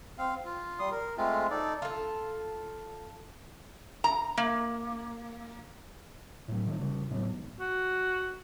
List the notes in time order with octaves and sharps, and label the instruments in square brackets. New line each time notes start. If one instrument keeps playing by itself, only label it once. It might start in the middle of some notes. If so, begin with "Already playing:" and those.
[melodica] C4 F5
F4
G3 C6 D#6
A#4
G#3 A3 C4 F4
D#4 A4 D5
[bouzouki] F4 A4
[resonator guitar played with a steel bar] A#5
A#3
[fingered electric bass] A2 F#3
D#3 F3 G3
C#3 G3
A2 F#3 B3
G#1
[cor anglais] F#4